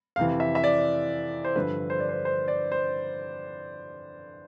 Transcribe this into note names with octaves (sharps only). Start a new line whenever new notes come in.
F2 C3 E3 F5
E5
E5
D5
C5
G2 D3 F3 B4
C5
D5
C5
C5
D5
C5